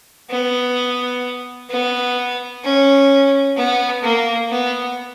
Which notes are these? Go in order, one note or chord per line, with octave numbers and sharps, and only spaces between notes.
B3
B3
C#4
B3
A#3
B3